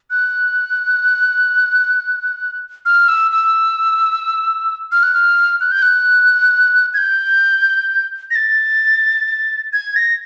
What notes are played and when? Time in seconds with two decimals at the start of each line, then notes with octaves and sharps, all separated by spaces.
0.10 F#6
2.86 F6
3.08 E6
3.32 E6
4.92 F6
5.03 F#6
5.14 F6
5.61 F#6
5.71 G6
5.82 F#6
6.94 G#6
6.98 G6
8.31 A#6
8.35 A6
9.73 G#6
9.96 A#6